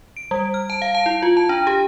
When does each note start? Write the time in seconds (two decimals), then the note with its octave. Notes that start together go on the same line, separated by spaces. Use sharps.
0.17 D7
0.31 G3
0.54 F6
0.70 A5
0.82 F5
0.95 A5
1.06 E4
1.22 F4
1.37 A5
1.49 D4
1.67 G4